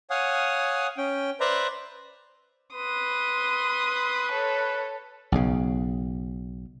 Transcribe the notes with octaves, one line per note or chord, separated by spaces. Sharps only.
C#5 F5 F#5 G#5 D#6
C#4 G5
B4 C5 D5 E5 A#5
B4 C6 D#6
A4 C#5
B1 C#3